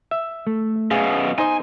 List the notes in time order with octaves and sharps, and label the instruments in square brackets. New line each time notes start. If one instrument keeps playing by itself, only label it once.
[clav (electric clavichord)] E5
[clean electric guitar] A3
[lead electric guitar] F#2 B2 [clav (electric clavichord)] G#4 [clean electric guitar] F5
[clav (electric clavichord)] D#4 C5 D#5 [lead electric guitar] G#5